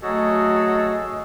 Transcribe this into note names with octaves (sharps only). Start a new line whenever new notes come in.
F#3 A3 F#4 G#4 A4 D#5